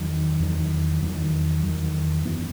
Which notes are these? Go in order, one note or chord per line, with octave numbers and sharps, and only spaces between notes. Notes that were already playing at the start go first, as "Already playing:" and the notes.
Already playing: E2 D#3 F#3
E2 D#3 F#3
E2 D#3 F#3
E2 D#3 F#3
F#2 E3 B3